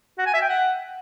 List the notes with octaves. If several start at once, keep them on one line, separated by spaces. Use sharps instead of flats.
F#4
G#5
E5
G5
F#5